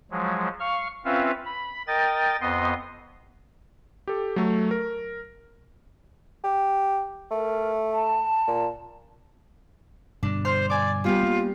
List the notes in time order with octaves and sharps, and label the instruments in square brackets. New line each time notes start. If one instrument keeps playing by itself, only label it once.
[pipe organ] F3 F#3 G#3
F5 C#6 F6
C4 C#4 F4 B4 E5 F5
B5
A#4 D#5 G5 A6
F2 B3 D#5 C6
[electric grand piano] G4 A4
F#3 A3
A#4
[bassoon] G4
[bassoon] A3 [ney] A#4
[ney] A5
[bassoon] A#2
[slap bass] G2 B2 D3 [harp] D4
[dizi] C5 [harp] C6 F6 G6
[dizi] D5 [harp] G#5 D6
[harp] G3 B3 G4 [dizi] F4
[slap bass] A#3